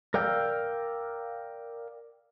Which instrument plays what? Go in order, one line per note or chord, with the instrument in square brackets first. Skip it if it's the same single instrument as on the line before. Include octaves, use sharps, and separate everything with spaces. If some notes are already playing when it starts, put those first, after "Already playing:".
[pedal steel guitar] A#4 D5 F5 G5 E6